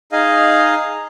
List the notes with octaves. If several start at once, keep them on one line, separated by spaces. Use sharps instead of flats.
D#4 G#4 D#5 F5